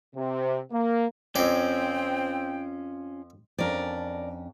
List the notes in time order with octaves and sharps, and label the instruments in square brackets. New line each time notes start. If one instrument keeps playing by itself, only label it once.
[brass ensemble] C3
A#3
[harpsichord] F2 D5 [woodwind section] C4 G5 [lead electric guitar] C#4 F4
[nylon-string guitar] F2 C#4 D4 [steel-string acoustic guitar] A#4 D5